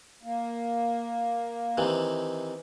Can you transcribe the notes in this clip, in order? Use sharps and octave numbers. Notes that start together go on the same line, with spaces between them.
A#3
C3 D#3 E3